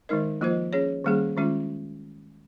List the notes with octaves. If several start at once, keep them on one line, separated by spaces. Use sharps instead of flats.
D#3 G#3 D#4 A#4 D#5
F3 A#3 F4 C5 D#5
C#4 G#4 C#5
D#3 G3 A#3 C#4 G#4
D#3 G#3 C#4 F4